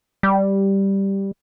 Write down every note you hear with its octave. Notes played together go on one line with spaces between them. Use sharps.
G3